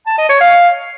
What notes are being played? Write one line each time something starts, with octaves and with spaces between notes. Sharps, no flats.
A5
D#5
C#5
F5